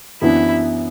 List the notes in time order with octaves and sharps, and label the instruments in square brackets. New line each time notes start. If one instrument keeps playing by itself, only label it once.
[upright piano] F#2 E3 B3 D4 [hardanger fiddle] E4